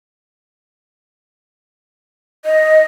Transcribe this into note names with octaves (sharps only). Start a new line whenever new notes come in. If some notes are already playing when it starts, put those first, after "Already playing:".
D#5